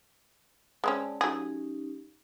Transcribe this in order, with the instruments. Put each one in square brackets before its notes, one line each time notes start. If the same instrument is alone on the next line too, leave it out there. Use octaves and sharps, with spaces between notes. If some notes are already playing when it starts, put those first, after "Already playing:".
[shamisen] G#3 C4 C#4 [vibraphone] D5 A5
[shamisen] F#3 A3 G#4 [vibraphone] C#4 D#4 G4